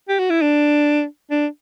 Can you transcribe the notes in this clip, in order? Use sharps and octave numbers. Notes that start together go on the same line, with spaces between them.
G4
F#4
E4
D4
D4